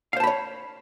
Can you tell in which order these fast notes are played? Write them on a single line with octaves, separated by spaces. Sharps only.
F5 C5 A5 B5 C#5